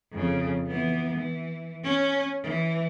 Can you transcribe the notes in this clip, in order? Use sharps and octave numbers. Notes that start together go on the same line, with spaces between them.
F2 C#3
E3 B3
E3
C#4
E3